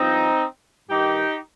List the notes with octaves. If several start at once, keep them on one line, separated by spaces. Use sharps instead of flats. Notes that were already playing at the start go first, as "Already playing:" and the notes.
Already playing: G2 F3 C4 D#4
G2 D#3 D#4 G4